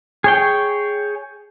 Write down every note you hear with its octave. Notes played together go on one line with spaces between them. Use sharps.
G#4 C#5 G5